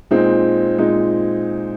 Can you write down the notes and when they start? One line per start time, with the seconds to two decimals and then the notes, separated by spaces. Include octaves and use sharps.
0.11 A#2 G#3 C4 D#4
0.78 A#2 G#3 C4 D#4